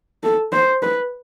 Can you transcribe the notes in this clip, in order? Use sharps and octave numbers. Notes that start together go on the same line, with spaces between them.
A4
C5
B4